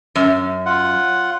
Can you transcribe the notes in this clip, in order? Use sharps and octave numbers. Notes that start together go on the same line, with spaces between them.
F#2
F4 F#5